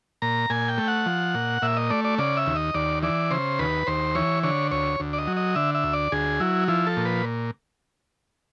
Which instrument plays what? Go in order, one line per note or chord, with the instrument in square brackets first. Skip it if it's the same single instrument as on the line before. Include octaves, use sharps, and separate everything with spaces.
[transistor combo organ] A#2 A#5
A#2 G#5
G5
A3
F#5
F3
A#2
A#2 E5
D#5
A3 D5
D5
C#3 D5
E5
D#2
D#5
D#2 D5
E3 D5
C#3 C5
D#2 B4
D#2 C5
E3 C#5
D3 C#5
D2 C#5
D2
D5
D#5
F#3
D#5
D3 E5
E5
D2
D5
D2 G#4
F#3 E4
F3 E4
A4
A#2
B4